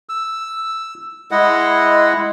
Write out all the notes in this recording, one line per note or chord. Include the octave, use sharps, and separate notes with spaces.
E6
G#3 E4 D#5 F#5